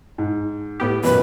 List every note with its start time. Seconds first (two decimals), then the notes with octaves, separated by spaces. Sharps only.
0.18 G#2
0.80 A2 B3 G4
1.04 A1 F#2 B2 E3 B4